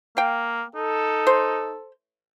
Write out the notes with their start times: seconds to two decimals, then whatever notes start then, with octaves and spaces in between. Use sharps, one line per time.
0.17 A#3 F5 G5
0.76 D#4 A4
1.27 C5